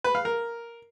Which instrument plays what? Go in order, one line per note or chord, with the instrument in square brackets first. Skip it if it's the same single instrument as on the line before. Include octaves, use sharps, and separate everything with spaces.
[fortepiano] B4
F5
A#4